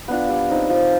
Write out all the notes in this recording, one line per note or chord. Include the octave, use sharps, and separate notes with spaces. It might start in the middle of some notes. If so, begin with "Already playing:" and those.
B3 D4 F4
G3
C4 D#4
F3